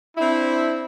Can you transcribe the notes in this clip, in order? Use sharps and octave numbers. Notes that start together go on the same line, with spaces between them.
C4 D4 E4